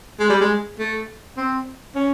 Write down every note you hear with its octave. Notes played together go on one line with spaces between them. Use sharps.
G#3
G3
G#3
A3
C4
C#4